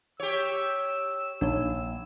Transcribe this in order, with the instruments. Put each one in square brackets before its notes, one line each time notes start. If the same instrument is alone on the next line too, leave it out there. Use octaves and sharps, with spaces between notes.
[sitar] G4 C#5 [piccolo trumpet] E6
[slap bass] A#1 [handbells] D4 D#4 C#5